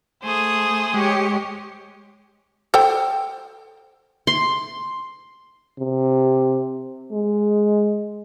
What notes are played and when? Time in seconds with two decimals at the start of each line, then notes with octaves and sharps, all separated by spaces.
0.23 A3 G#4 C5 D#6
0.94 G#3 G4 C#5
2.74 A4 C5 G5
4.27 C6
5.79 C3
7.12 G#3